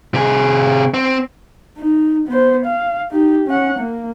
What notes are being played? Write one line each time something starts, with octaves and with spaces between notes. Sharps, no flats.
C3 G#4
C4
D#4
B3 C5
F5
D#4 G4
C#4 F#5
A#3